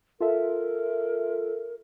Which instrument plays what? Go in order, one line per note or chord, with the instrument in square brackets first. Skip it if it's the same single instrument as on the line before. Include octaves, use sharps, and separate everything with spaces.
[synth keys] F4 A4 E5 [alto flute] A#4